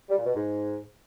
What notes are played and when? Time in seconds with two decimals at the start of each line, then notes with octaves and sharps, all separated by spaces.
0.09 G3
0.17 A#2
0.26 B2
0.34 G#2